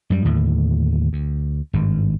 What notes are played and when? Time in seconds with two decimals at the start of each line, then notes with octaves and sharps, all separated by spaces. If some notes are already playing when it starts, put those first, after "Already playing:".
0.10 F#2 G3
0.25 D#2 A2 D3
1.13 D2
1.73 G#1 G2